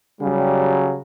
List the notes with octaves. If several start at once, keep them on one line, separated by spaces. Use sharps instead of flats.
C#3 F#3 G3